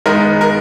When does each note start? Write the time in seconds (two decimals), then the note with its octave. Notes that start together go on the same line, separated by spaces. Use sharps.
0.06 D#3 G#3 B3 A#4
0.41 A#4